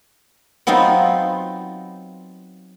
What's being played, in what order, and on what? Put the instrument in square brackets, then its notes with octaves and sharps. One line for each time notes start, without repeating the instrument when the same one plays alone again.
[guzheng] F#3 B3 C4 D#4 F4